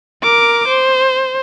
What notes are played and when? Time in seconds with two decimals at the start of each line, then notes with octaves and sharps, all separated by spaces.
0.23 A#4 D6
0.68 C5